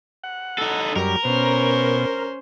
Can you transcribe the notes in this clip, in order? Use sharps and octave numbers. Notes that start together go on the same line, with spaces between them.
F#5
D#4 A4
F#2 G3 A#4
B2 C#4 C5